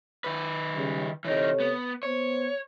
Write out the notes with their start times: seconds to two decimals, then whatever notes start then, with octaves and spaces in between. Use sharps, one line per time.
0.24 D#3 B4
0.74 C#3 G3
1.25 C3 E3 D#4 A4 C#5
1.60 B3
2.03 B3 C5 C#5